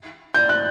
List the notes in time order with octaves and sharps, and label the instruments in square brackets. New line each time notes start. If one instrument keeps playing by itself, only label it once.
[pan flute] D5 [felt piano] G6
[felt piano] F#6